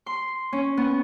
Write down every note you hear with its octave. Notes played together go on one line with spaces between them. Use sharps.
C6
C#4
B3